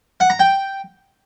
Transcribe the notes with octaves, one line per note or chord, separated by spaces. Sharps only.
F#5
A#5
G5